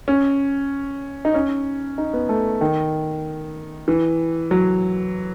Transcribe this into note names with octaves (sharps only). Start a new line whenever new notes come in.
C#4
D#4
C#4
D#4
B3
A3
D#3
E3
F#3